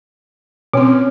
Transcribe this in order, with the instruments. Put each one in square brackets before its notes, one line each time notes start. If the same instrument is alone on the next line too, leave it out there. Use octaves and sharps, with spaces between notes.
[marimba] B2 C4 [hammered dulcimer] C#4